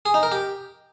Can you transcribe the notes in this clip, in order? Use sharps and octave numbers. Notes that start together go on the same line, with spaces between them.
G#4
D#4
A#4
G4